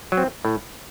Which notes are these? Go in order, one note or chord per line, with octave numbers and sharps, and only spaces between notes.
F#3
C4
A2